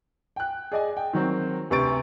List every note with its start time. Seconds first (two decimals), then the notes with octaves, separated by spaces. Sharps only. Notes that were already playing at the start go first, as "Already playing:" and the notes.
0.36 G5 F#6
0.72 G#4 D5 D#5 G#5
0.97 G5
1.13 D#3 F#3 C4
1.70 D2 C3 B4 C#6 A6 D7